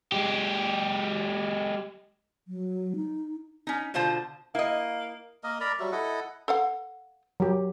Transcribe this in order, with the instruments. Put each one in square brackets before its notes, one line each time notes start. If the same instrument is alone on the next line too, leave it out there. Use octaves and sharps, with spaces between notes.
[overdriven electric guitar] G#3 G4
[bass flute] F#3
D#4
[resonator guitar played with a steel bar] C#4 D#4
B2 D3 F4 C5 A5
[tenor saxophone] A#3 [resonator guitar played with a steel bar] E4 D#5
[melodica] A#3 A#4 D#5
A#4 D5 A#5 B5
F#3 G3 F#4 E5
E4 A4 D#5 F#5
[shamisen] A4 F5 F#5
[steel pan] F#3 G4